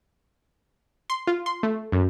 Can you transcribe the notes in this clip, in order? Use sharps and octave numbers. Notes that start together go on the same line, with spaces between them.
C6
F4
C6
A3
F#2